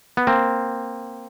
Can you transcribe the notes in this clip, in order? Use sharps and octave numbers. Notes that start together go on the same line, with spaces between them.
B3
A#3 C4